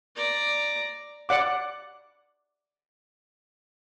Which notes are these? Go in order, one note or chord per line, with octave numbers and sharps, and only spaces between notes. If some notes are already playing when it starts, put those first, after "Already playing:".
D5 A#5
D5 F#5 D6